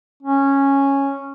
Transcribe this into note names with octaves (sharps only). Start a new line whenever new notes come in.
C#4